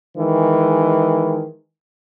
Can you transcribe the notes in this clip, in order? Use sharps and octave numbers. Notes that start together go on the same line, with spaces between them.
D#3 E3 G#3